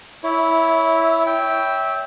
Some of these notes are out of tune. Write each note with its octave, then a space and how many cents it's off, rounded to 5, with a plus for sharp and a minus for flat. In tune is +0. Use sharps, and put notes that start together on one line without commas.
E4 -5 C#5 +15 E5 -20
C#5 +15 E5 -15 G5 +0